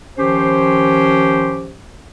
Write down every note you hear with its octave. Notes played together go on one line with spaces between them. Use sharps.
D#3 F3 C#4 G4 C5